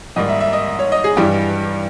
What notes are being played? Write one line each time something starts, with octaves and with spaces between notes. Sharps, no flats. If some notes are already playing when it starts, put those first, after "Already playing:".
G#2 D#3 G3 A#3 D#5
E5
E5
D#5
C#5
D#5
G#4
G2 E3 G3 G4